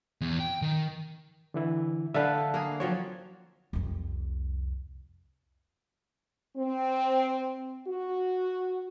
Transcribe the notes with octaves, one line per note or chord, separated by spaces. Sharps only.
E2
G5
D#3
D3 E3 E4
D3 B4 E5 F5 A5
A#3 G#4
F3 F#3 C4 C#5
C2 F2
C4
F#4